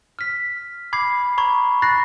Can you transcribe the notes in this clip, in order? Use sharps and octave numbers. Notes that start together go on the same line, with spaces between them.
F6 B6
B5 D6 G#6 C7
A#5 B5 C#6 G#6
B5 F#6 A6 A#6 C7